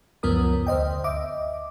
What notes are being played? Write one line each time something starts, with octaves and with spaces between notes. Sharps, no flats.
C#2 F#2 F3 B3 A#4 D#6
D2 C5 D#5 G5
D#5 E5 D6